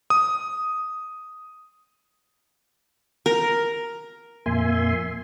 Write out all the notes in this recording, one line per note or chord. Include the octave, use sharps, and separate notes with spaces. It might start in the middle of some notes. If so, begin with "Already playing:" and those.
D#6
A#4
F2 A#2 A#3 E5 G#5 C6